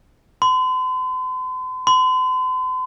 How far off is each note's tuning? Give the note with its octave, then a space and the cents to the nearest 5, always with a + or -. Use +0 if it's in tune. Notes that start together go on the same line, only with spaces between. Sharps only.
C6 -45
C6 -45